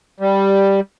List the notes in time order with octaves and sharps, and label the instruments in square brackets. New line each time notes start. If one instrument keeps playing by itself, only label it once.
[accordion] G3